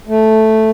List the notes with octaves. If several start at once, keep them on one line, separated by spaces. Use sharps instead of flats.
A3